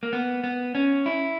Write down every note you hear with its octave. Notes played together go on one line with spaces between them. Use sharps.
A#3
B3
B3
C#4
E4